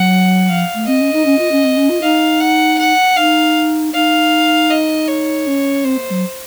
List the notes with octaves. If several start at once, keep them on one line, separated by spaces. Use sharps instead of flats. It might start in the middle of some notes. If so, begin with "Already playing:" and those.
Already playing: F#3 F#5
F3 F5
A3
C4 D#5
C#4
D#4
C#4
F4
C#4
C4
C#4
F4
D#4 F5
F#5
F#5
D#4 F5
D#4 F5
D#5
C#5
C#4
C4 C5
A#3
F#3